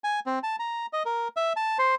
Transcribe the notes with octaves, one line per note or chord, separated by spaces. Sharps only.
G#5
C4
A5
A#5
D#5
A#4
E5
A5
C5